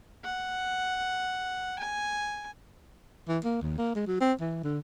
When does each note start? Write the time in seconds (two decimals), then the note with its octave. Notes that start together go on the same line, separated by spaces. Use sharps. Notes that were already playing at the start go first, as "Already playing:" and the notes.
0.24 F#5
1.79 G#5
3.28 E3
3.44 A#3
3.62 D#2
3.78 A#3
3.95 G#3
4.07 F#3
4.20 C4
4.41 E3
4.64 D3